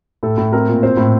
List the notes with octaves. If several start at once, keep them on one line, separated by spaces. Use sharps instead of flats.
A2 A4
A2
C4 A#4
A#2
C4 C5
A2